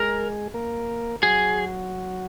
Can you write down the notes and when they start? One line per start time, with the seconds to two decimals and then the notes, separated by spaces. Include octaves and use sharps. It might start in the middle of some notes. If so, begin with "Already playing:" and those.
Already playing: G#3 G#4 A#4
0.54 A#3 A#4
1.22 F#3 F#4 G#4